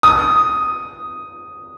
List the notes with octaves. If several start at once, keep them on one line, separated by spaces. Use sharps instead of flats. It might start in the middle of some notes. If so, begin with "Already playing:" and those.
D#6